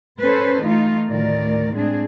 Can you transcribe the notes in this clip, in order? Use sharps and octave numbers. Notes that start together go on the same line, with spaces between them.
C#4 A4 B4 C5
E3 A3 D#4 F4
D2 A2 D#3 A#4 D5
A2 G#3 C4 D4 G#4